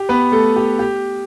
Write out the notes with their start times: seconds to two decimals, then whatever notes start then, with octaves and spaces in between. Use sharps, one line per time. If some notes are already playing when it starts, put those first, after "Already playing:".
Already playing: G4
0.09 B3 B4
0.32 A3 A4
0.56 G4
0.79 G4